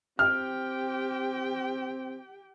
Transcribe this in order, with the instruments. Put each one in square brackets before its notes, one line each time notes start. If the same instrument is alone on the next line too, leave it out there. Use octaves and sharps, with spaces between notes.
[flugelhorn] C4 [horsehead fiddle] G4 G5 [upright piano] F6